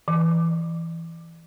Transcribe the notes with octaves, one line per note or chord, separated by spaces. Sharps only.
E3